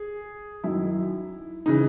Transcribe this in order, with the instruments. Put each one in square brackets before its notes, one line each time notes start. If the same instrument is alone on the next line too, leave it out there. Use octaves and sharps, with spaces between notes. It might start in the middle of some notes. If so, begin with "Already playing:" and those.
Already playing: [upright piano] G#4
F#2 D#3 E4
C#3 E3 D#4